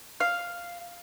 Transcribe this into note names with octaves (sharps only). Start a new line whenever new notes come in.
F5